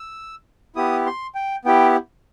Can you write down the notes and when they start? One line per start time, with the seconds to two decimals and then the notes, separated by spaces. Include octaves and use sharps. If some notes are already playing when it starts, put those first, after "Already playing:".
Already playing: E6
0.76 B3 E4 G4 D#6
1.06 C6
1.35 G5
1.65 B3 E4 G4 G5